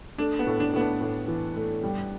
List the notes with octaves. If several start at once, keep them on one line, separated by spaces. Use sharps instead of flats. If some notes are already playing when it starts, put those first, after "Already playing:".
A3 D4
B3
A2
D4
A2 B3
D4
A2
E3
A3
G3